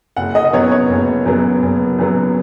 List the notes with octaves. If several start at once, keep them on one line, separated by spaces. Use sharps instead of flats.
F#1 F#5
D#5
F#2 F#3 B3 C#5
C#5
F#1
F#2 F#3 B3
F#1
F#2 F#3 B3